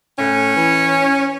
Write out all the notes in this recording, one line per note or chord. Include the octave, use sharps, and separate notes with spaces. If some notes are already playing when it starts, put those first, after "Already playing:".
A2 C#4
E3